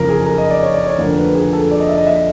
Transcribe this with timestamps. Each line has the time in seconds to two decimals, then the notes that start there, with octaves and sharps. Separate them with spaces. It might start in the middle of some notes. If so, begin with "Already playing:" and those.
Already playing: F#1 F2 C#3 F3 A#4
0.09 G#4
0.26 A#4
0.38 D#5
0.50 D5
0.63 C#5
0.74 D5
0.86 C#5
0.99 F1 F2 D3 F3 A#3
1.17 B4
1.35 G#4
1.53 A4
1.71 D5
1.80 D#5
1.89 E5
1.98 D#5
2.07 E5